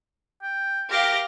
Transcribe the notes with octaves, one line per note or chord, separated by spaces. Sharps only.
G5
G4 A#4 F5 A#6